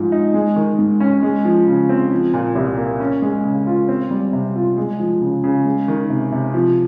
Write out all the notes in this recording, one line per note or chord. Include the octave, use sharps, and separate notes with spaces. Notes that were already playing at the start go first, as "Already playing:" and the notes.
Already playing: G#2 F3 G#3
D#4
G#3
D#3
G#2
C#4
G#3
F3
C#3
C4
F3
A#2
C2
A#3
C#4
G#3
C#3
F4
C4
G3
C3
F4
G#3
F3
C#3
C#3
G#3
D#3
C3
C3
F3